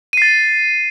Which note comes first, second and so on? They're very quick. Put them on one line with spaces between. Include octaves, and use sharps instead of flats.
D#7 C7 A6